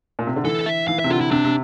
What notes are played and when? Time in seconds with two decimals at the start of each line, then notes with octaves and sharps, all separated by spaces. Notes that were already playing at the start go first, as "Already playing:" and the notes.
0.19 A#2
0.27 C3
0.36 D3
0.45 E3 A4
0.66 E5
0.88 E3 F5
0.99 C3 E5
1.10 D3 F4
1.21 E4
1.31 C3 D4
1.45 C3